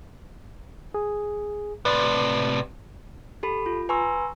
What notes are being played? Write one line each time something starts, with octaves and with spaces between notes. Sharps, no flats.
G#4
A2 C3 B4 D5
G4 A4 B5
F4
B4 G#5 A#5 C6 C#6 E6